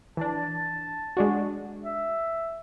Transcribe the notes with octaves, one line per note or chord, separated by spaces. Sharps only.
E3 D4 A5
G#3 D4 F#4
E5